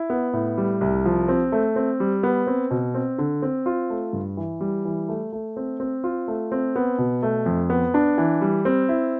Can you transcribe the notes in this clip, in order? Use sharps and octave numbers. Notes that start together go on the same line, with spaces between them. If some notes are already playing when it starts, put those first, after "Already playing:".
Already playing: E4
B3
A2
G3
C2
F3
C4
A3
C4
G3
B3
C4
B2
C4
D3
C4
F4
A3
G2
E3
G3
E3
A3
A3
C4
C4
F4
A3
C4
B3
B2
A3
F2
B3
D4
E3
G3
C4
E4